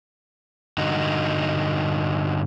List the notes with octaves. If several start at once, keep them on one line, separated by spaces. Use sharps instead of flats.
G2 D3 D#4 F#4